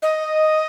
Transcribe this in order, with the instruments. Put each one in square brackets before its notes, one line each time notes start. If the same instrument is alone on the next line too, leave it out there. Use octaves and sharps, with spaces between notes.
[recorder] D#5